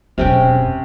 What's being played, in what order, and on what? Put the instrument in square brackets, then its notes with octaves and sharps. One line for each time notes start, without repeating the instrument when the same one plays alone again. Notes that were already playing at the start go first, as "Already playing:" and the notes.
[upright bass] E1 F#2 [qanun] C3 C#4 G5